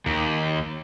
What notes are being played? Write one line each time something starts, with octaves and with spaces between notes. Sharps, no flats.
D#2